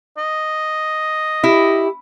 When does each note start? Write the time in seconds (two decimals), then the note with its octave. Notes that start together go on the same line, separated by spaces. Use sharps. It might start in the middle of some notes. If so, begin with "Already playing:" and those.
0.17 D#5
1.44 E4 G4